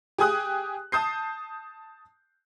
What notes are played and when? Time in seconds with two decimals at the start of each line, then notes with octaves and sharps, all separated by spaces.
0.18 G4 G#4 G#5 D#6 F#6
0.92 A5 D#6 G6 C7